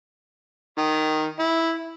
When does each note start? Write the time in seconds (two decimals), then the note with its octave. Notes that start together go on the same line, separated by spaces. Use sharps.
0.79 D#3
1.39 E4